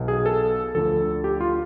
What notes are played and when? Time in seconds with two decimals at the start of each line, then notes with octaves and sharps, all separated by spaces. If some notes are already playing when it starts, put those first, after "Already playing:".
Already playing: B1 B2
0.08 G#4
0.26 A4
0.75 D2 D3 F3 A4
1.24 G4
1.41 F4